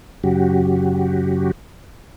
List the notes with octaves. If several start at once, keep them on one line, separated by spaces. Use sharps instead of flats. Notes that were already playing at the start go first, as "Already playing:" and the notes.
F#2 C#3 F#3 F#4 G4